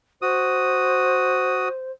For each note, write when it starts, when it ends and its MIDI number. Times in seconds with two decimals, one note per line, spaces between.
0.22 1.69 66
0.22 1.92 72
0.22 1.69 87